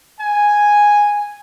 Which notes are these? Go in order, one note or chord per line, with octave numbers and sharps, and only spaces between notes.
G#5